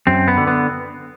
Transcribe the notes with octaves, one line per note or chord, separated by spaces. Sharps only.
F#2 C4
B3
D3
B3